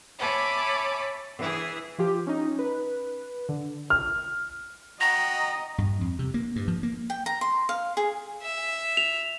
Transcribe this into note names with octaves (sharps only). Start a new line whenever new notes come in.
C#5 E5 G#5 A5 B5 D6
E3 G#4
F3 F4 G4
C#4 D#4
B4
D3
F6
F#4 D#5 G5 A#5 A#6
G2
F2
C3
A#3
G2
F3
A#3
G5
A#5
C6
F5
G#4
E5
F7